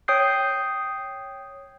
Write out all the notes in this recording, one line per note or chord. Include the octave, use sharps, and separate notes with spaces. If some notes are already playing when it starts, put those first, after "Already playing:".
C#5 G5 D#6 G6 C7